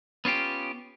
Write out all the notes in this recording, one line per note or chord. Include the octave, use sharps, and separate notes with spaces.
B3 C#4 F4 G4